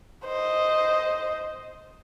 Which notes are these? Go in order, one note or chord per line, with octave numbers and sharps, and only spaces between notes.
C5 D#5